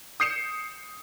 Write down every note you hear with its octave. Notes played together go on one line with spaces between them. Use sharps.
D#6 G6 C7 C#7 E7